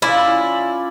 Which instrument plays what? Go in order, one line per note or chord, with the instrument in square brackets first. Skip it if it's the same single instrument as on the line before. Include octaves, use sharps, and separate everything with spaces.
[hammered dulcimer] C#4 F4 D5 [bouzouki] E4